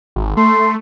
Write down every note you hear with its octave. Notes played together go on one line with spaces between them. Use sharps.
G#1
A3 C6